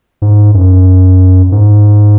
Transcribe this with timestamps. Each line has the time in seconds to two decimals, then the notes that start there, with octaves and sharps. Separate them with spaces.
0.22 G#2
0.54 F#2
1.52 G#2